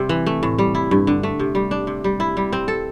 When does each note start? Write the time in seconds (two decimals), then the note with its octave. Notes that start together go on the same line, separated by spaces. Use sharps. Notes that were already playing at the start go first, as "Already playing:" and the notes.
Already playing: C3 G3 C4
0.09 E3
0.26 A3
0.43 A2
0.58 G3
0.75 E4
0.91 G2
1.07 D3
1.23 A3
1.39 C3
1.55 G3
1.71 D4
1.87 C3
2.04 G3
2.20 E4
2.37 G3
2.53 C4
2.68 A4